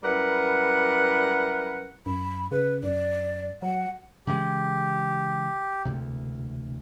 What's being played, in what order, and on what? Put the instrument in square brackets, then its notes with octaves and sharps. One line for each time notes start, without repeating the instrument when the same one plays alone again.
[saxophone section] F#2 G3 E4 A#4 B4 F#5
[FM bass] F#2 [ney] B5
[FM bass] C#3 [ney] B4
[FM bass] F#2 [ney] D5
[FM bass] F#3 [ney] F#5
[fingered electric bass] C#3 E3 G#3 [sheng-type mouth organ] G4
[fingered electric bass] E1 D2 C3